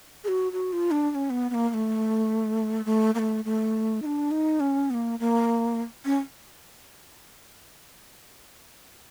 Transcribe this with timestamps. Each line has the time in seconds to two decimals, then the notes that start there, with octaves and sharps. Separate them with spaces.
0.24 G#4
0.28 F#4
0.52 F#4
0.73 F4
0.91 D4
1.11 D4
1.15 C#4
1.30 B3
1.50 B3
1.54 A#3
1.69 A#3
1.74 A3
2.86 A3
3.15 A#3
3.19 A3
3.45 A3
4.02 D#4
4.06 D4
4.31 D#4
4.60 C#4
4.90 B3
4.94 A#3
5.20 A#3
6.05 C#4